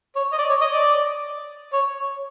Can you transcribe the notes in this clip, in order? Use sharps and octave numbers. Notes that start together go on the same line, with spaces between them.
C#5
D#5
D5
C#5
D#5
D5
C#5